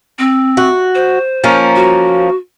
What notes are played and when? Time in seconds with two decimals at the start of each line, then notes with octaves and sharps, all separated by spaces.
0.19 C4
0.57 F#4
0.95 C5
1.44 F3 A#3 C#4
1.76 F#4